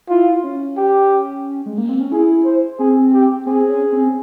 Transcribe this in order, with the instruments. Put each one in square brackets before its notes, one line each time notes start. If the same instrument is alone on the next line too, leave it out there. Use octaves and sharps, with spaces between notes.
[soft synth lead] E4 [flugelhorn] F4
[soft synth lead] C#4
[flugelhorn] G4
[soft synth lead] G#3
A#3
C4
C#4
[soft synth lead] E4 [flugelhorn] G#4
[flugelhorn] C5
[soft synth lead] C4 [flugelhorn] G#4
[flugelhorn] G4
[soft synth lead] C4 [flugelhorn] G#4
[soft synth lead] C#4
C4